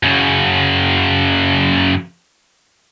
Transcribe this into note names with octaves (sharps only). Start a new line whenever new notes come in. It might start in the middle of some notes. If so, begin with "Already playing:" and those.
F#2 C#3